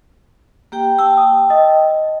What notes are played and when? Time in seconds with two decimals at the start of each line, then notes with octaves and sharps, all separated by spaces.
0.72 A#3 G4 G5
0.99 G5 A5 E6
1.17 D#6
1.50 D#5